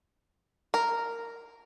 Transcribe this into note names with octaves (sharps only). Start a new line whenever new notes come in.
A#4